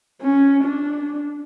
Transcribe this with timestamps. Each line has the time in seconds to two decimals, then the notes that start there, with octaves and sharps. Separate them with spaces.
0.22 C#4
0.64 D4